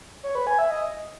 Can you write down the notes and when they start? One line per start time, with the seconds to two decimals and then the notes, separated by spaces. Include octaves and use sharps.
0.23 C#5
0.35 B4
0.47 G#5
0.59 E5
0.70 D#5